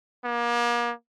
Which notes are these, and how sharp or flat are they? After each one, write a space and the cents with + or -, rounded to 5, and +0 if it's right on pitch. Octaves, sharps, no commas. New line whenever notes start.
A#3 +35